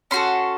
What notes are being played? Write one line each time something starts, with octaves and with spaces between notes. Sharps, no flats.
C#4 F#4 A4 C6